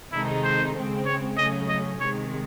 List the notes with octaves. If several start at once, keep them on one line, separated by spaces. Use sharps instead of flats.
C3 D#3 G#3 D#4 E4 A4
C5
C#3 G#3 C4
C#5
C#3 F#3 A3 C#4 D#5
D#5
C3 D#3 G#3 C#5